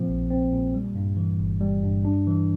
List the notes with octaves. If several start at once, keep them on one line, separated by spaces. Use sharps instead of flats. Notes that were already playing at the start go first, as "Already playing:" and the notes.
Already playing: A#2 F3 C4
A#1
C4
A#2
G3
G2
E3
G1
G3
G2
D4
E3